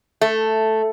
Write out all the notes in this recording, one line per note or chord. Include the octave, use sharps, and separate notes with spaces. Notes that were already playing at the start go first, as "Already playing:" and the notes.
A3